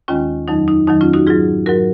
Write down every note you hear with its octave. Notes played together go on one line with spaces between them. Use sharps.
D#2 D#3 G#3 C#4 F4
F2 D#3 F#3 D#4
D#4
F2 D#3 F#3 D#4
C#4 F4
D#4 F#4
G#2 F#3 F4 G#4
G#2 F#3 F#4 A#4